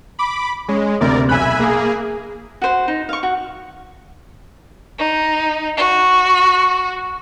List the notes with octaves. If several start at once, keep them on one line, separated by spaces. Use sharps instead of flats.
B5 D6
G#3 C#4
D2 C3 A#4 D5
B1 E5 G#5 B5 F#6
A#3 G#4
F#4 C5
D#4
F5 C#6
F#4
D#4
F#4